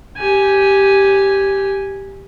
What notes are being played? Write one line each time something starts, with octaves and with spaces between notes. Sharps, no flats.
G4 G#5